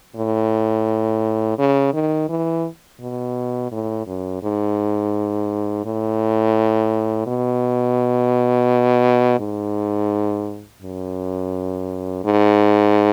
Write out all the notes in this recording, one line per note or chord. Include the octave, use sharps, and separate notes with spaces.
A2
C#3
D#3
E3
B2
A2
F#2
G#2
A2
B2
G#2
F#2
G#2